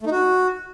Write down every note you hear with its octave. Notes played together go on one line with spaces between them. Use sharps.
A3
D#4
F#4